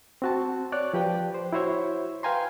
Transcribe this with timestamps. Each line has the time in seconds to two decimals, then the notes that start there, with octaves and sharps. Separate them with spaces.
0.22 C4 F#4 A5
0.72 C#5 D5 F#6
0.94 F3 G4 B4 D5 G5
1.34 C5
1.53 E4 F#4 C5 C#5 E5
2.23 B4 F5 G5 G#5 A#5 C6